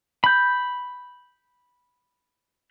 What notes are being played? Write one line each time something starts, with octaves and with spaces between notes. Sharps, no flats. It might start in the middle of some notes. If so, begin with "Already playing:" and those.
B5 G6